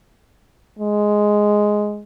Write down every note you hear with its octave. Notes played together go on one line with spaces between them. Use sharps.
G#3